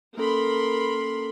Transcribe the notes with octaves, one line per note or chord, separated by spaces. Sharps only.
A#3 C#4 A4 A#4 B5 C6